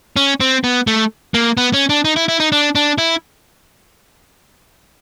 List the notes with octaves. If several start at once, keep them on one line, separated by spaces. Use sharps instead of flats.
C#4
C4
B3
A3
A#3
B3
C#4
D4
D#4
E4
E4
D#4
D4
D4
E4